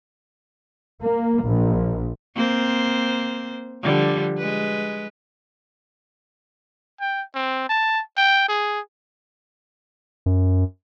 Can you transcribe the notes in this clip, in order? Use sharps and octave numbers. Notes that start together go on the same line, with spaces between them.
A#3
A#1
A#3 C4 C5
D3 F3 G3
G#3 B4
G5
C4
A5
G5
G#4
F#2